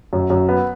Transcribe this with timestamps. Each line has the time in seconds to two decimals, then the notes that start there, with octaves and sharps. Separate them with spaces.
0.13 F#2
0.30 F#2
0.49 B3